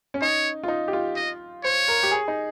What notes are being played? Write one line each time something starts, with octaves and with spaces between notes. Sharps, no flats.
C#4
D#4 C#5
F4
D#4
G4
F4
D#5
C5 C#5
A#4
G4
G#4
D#4